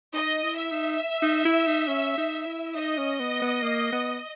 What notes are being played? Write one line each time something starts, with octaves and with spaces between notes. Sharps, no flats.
D#4 D#5
E4
E5
D#4
D#4
E4
D#4
C#4
D#4
E4
D#4 D#5
C#4
B3
B3
A#3
B3